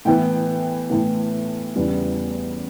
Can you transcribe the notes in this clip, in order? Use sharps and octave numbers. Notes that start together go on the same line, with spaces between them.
A2 E3 B3 G5
A2 E3 B3
E2 C#3 G3 B3